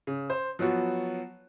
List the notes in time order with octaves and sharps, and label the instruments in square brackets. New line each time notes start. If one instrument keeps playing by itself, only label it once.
[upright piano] C#3
C5
F3 F#3 B3 F#4